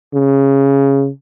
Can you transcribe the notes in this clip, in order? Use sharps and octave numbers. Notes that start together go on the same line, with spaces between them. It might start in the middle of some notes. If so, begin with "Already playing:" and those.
C#3